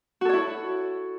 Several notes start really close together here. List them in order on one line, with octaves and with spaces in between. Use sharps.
F#4 A4 C#5 E4